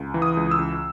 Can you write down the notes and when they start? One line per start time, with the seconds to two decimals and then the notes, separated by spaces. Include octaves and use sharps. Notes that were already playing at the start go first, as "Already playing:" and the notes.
Already playing: C#2
0.14 E3
0.22 D#6
0.37 C#2
0.51 E6
0.58 C#2